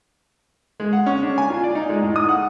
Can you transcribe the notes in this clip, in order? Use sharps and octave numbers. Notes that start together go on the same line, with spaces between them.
G#3
F#5
C#4
D4
G#5
F4
D5
D#4
G#3
A2
D#6
F#5